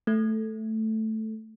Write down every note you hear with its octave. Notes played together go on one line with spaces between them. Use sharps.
A3